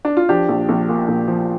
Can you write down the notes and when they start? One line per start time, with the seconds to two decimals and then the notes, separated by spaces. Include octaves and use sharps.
0.05 D4
0.17 F4
0.29 F3 D4 G4
0.49 A#1
0.69 A#1
0.89 A#2
1.08 A#1
1.28 F3